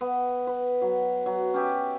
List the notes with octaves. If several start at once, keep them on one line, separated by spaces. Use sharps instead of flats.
B3
B4
F#3
F#3
C#4 G4 E5